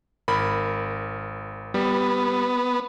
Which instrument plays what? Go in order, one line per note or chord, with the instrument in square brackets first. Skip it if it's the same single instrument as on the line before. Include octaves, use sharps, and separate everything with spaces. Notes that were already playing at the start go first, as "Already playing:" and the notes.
[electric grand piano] G#1 A#4 B5
[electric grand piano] G3 [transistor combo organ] B3